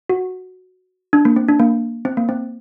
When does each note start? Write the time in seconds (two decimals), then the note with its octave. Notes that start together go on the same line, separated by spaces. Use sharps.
0.09 F#4
1.13 D4
1.25 A#3
1.36 C4
1.48 D4
1.60 A#3
2.05 C4
2.17 A#3
2.29 C4